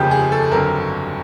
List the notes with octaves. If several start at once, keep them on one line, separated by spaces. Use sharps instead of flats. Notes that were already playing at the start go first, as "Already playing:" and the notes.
Already playing: F1 D#2 C#3 F3 G4
G#4
A4
G1 F2 D3 F#3 A#4